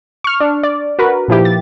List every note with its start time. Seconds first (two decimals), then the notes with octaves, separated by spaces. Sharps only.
0.24 C#6 F6
0.40 D4
0.63 D5
0.99 F#4 A#4 B4
1.28 A#2 F3 E4 G4
1.45 A6